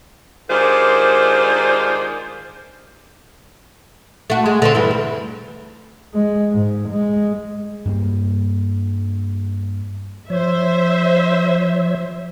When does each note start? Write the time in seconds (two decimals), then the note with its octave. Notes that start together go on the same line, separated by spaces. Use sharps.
0.50 D#3 G#3 D4 F4 G4 C5
4.30 A3 F#4
4.46 G#3
4.62 D3 A3 C4
4.75 G2 E3
4.91 D2
6.14 G#3
6.53 G#2
6.89 G#3
7.85 G2 G3 A#3
10.30 F3 C5 C#5 E5